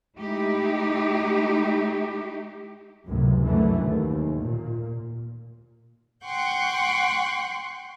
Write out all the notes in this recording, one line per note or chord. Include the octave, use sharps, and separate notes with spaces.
G#3 A3 D#4 E4 G4
C#2 F#2 A2 C3
F#2 D3 E3 A3
D#2
A#2
F#5 G5 C6 C#6 F#6 G6